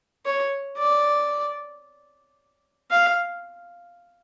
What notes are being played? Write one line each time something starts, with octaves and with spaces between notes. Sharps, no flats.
C#5
D5
F5